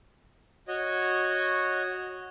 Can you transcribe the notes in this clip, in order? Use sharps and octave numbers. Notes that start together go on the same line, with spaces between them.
F#4 C#5 D#5